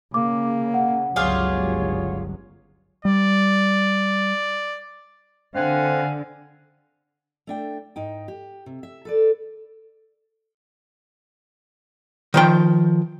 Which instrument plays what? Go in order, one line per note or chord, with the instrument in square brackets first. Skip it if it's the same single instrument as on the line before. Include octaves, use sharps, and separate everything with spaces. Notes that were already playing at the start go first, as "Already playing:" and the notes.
[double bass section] C#3 [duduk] A#3 [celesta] D6
[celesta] F#5
[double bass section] G1 C#2 F#3 [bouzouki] F4 G4 G#4 [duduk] C#5
[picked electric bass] G3 [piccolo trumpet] D5
[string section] D3 [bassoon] C4 [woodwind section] F5 F#5 G#5
[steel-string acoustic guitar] A3 D4 G5
G#2 D#4 G5
G4
C3
E5
A4 B4 D5
[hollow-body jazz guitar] D#3 F3 G5